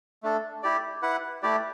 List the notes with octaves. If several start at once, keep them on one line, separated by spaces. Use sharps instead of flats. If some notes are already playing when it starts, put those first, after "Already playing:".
A3 D4 A4
E4 G4 D5
E4 B4 F#5
A3 E4 G4 D5